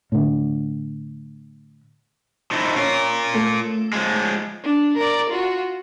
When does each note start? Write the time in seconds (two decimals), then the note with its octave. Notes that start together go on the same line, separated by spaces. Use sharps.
0.12 A2 D3
2.51 F3 D#4 E4
2.76 C#4 F4 A#4
3.34 A3
3.93 F3 G#3
4.64 D4
4.97 A#4 D5
5.30 F4 F#4